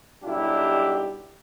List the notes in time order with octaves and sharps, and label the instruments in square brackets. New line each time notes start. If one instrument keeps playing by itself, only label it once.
[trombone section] B1 F#3 G3 D4 E4 G4